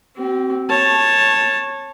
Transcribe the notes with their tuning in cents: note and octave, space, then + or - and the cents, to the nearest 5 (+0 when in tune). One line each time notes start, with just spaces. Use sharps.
C4 +0 F#4 +45
C#5 -15 A5 +0